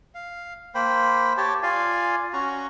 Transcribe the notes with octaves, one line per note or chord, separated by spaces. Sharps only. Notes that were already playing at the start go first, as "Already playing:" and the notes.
F5
A#3 C5 G5 B5
G4 C#5 A5
F4 D5 F5 G#5
C#4 F#4 A#5